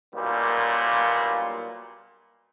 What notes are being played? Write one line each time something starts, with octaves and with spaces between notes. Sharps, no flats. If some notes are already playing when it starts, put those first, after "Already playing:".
B1 A#2 G3 A#3